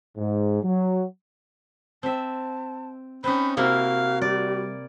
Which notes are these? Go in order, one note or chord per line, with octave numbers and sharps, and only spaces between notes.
G#2
F#3
C4 E5 A5
C4 C#4 D#4 B5
C3 A#3 E4 F#4 F5
G3 D5